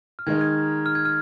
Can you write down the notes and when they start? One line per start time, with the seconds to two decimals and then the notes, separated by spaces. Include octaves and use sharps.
0.19 F6
0.27 D#3 G#3 D#4 G#6
0.41 G#6
0.86 F6
0.95 G#6
1.05 F6